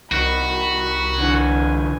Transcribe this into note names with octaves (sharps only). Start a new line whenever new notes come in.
C2 D#3 F#4 B5
D3 E3 G#5